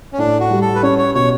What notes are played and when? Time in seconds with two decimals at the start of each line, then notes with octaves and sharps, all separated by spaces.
0.13 C#4
0.18 A2 D4
0.40 F#4
0.50 G3
0.61 A4
0.75 B4
0.83 C#4 C#5
0.98 C#5
1.15 B2 C#5